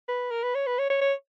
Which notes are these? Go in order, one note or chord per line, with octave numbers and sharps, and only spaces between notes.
B4
A#4
B4
C#5
B4
C#5
C#5
C#5